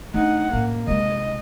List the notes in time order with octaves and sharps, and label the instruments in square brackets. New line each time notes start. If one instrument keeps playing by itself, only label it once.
[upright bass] A3 D4 [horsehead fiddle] D#4 F#5
[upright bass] A2 C#4 [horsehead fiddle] A#3
[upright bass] C3 G#3 [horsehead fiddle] D#5